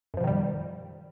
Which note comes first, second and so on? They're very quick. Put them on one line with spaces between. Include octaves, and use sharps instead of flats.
F#2 F3 B2 D#3 G3